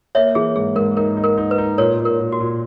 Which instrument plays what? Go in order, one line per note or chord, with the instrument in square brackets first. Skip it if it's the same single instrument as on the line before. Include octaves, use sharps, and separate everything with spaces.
[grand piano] A#3 [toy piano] C#5 E5
[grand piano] E3 [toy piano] G#4
[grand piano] G#2 [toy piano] G#4
[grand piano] G#2 [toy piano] A#4
[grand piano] D#4 [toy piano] A#4
[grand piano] D#4
[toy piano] A#4
[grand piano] D#4
[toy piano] B4
[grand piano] D#4
[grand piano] A#2 [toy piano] A#4 C#5
[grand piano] A#2
[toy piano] A#4
[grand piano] A#2
[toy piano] F#4
[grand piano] A#2